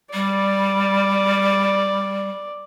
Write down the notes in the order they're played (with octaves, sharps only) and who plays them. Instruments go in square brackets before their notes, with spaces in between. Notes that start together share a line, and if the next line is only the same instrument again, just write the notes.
[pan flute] G3 [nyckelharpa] D5